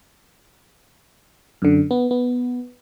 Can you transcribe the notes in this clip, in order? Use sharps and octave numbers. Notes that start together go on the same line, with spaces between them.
F#2 D3
B3
B3